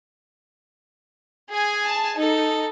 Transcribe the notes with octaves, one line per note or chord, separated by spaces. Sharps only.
G#4 G#5
A5
D#4 A4